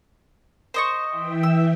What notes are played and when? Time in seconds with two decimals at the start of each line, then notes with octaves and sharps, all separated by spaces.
0.74 C5 D#5 C#6
1.09 E3 E5 G5
1.43 E6